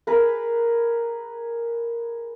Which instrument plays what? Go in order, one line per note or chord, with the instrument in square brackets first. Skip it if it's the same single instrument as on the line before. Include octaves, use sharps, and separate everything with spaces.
[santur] G#4 A#4 B4